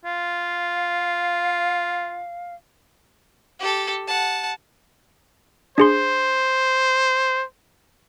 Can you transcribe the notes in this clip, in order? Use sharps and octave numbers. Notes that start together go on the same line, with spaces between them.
F4 F5
G4 A4
F#5 A5
D4 G#4 C5 C6